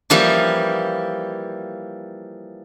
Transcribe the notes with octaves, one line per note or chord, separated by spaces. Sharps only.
E3 F3 G3 A#3 E4